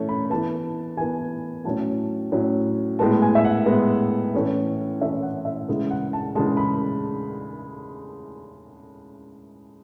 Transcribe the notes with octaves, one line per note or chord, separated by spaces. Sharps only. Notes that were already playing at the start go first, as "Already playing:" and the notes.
Already playing: E3 A3 C#4
B5
E3 B3 A5
E3 B3 G#5
A2 F#3 C#4 A5
A2 F#3 C#4
A2 G#3 B3 A5
G#5
E5
F#5
A2 G#3 B3
A2 E3 A3 C#4
A2 E3 A3 C#4 E5
F#5
E5
C#3 E3 G#3
F#5
A5
C#3 E3 G#3 A5
B5